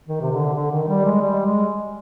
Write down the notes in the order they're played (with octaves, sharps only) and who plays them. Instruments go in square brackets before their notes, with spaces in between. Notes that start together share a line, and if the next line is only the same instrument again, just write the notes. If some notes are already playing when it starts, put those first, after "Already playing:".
[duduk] D#3
C3
D3
D3
D#3
G3
G#3
G3
G#3